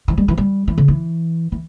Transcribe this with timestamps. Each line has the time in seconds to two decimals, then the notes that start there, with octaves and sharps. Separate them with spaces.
0.08 E3
0.18 G3
0.28 E3
0.38 G3
0.68 E3
0.78 C#3
0.88 E3
1.52 E3